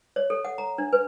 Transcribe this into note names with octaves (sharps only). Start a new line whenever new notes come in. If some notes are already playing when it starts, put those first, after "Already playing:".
C#5
A4
F#5
A#5
D4
B4